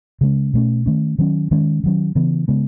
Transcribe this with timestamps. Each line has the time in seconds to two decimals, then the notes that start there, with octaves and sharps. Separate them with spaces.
0.21 C#3 G#3 C#4
0.54 B2 A3 C#4
0.86 D#3 A3 C#4
1.18 D#3 F#3 C#4
1.51 D#3 G#3 C#4
1.84 D#3 F#3 C#4
2.15 C#3 E3 B3
2.48 C#3 G#3 B3